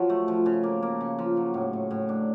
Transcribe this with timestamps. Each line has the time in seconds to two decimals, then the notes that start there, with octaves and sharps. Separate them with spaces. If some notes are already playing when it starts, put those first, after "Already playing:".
Already playing: F3 F#3
0.10 A3
0.28 F3
0.46 C#3
0.63 A#3
0.83 A#3
1.01 C#3
1.19 F3
1.37 F#3
1.54 A2
1.73 A2
1.91 A2
2.09 D4